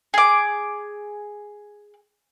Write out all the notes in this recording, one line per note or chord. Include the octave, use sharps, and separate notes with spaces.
G#4 D6